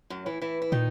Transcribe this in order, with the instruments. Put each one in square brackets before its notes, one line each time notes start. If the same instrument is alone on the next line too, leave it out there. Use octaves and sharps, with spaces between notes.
[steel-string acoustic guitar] F#2 F#3
E3 E4
E3 E4
E4
[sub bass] A#2 [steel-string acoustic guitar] D#3 D#4